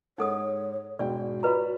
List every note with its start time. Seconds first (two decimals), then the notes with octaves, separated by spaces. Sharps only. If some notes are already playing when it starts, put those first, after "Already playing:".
0.18 G#2 D#4 A4 C#5 F#5 D#6
0.99 E1 G#2 F#4 D5 G5
1.43 F4 B4 C#5 D5 A#5 B5